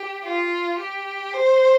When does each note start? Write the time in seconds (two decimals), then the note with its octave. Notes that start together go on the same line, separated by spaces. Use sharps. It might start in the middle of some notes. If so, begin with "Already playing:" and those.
Already playing: G4
0.24 F4
0.79 G4
1.34 C5